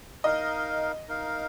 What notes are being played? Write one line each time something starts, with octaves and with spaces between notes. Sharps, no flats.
D#4 A#4 D#5 F5
D#4 A#4 F5